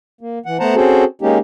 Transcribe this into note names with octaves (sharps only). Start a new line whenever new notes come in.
A#3
E3 F#5
A3 B3 C5 F#5 A5 A#5
C4 C#4 F#4 G#4 A4 C5
G#3 A#3 C#4 D#4 G4